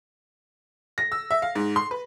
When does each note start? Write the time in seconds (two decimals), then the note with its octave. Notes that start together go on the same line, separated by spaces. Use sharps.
0.98 A#6
1.12 E6
1.31 E5
1.42 F5
1.55 G#2
1.76 C6
1.91 B4